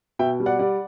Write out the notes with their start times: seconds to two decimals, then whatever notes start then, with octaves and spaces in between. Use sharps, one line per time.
0.19 B2 E5 G5
0.40 G3
0.46 D5 F#5
0.59 G3 D5 F#5